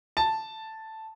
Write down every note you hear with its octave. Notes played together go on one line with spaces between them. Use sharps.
A5